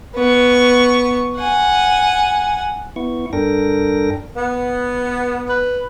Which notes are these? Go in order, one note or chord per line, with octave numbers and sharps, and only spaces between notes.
B3 C#6
F#5 G#5
B3 E4 C#6
G2 D4 A4 A#4 G5 A#6
B3
B4